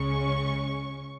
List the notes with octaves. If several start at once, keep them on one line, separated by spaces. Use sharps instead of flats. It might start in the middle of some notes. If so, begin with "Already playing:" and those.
Already playing: C#2 C#3 G#3 C#4 C#6